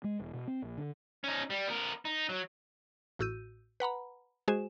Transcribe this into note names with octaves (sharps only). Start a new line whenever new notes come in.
G#3
E1
B2
C4
A#1
D3
C#4 D#4
G3
B3 A#4
D#4
F#3
A1 A2 F#4 E6 G6 D#7
B4 F#5 A#5 B5
G#3 F#4 G#4 C5 G#5 E7